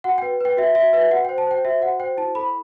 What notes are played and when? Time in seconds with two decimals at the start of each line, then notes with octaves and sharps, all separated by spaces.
0.04 F#4 F#5
0.18 B4 G5
0.40 B4 G5
0.57 F#4 E5
0.75 F#4 E5
0.93 B4 E5
1.11 F#4 F#5
1.25 G5
1.29 C5
1.38 A5
1.47 C5 G5
1.65 F#4 E5
1.82 F#4 F#5
2.00 C5 G5
2.17 E4 A5
2.35 A4 B5